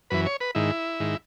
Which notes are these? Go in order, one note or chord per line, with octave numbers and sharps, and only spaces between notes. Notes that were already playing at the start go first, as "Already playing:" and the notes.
F#2 E3 B4
C#5
B4
G#2 D#3 E4
G#2 D#3